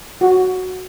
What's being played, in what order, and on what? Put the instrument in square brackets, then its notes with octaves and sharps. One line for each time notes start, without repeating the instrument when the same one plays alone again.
[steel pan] F#4